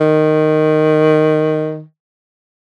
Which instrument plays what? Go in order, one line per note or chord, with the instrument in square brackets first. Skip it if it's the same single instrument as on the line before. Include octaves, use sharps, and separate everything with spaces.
[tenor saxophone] D#3